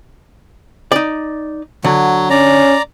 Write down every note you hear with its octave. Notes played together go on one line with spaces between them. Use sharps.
D#4 D5
D3 F#3
C#4 D5 A#5